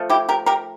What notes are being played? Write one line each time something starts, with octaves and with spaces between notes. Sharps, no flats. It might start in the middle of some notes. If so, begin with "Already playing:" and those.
Already playing: F3 A3
E4 G4
G4 A#4
G4 A#4